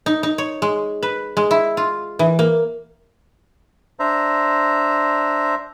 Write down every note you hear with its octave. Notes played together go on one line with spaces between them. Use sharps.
D#4
D#4
C#5
G#3
B4
G#3
E4
F4
E3
A#3
D4 C5 E5 A#5